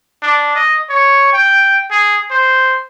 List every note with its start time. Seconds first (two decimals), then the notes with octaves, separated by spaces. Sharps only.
0.23 D4
0.55 D#5
0.90 C#5
1.33 G5
1.90 G#4
2.31 C5